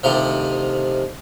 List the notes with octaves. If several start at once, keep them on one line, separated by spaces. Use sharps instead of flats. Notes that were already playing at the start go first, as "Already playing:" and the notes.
D2 C3 D#3 F3